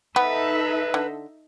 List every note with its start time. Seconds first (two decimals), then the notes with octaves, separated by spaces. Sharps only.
0.16 B3 D#4 A4 B4 E5
0.94 D3